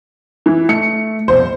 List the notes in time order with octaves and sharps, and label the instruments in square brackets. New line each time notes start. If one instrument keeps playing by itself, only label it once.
[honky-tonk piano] E3
[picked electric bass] A3 [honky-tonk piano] C#7
[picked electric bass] C2 F2 B2 [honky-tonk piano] C5